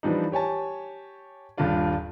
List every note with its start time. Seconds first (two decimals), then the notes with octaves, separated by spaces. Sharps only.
0.03 E3 F3 G3 D4 D#4
0.32 G4 C#5 G#5 A5
1.58 D#1 G2 D4 F4 D5